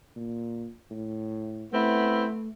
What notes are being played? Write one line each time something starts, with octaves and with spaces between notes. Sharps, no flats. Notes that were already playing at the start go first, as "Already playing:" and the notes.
A#2
A2
A3 B3 C4 E4